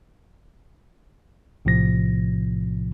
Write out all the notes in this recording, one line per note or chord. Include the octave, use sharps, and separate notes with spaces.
B1 A2 C3 F3 A#6